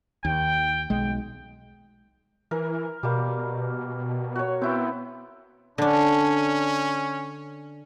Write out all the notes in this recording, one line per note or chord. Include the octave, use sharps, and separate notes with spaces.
D#2 G5
B1 G#3 G5
E3 A#4
B2 G3 A#3
F#4 C#5
B3 C4 E4 G5
D3 C#4 D4